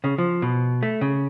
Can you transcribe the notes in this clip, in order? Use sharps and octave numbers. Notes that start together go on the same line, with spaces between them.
C#3
F3
B2
A3
C#3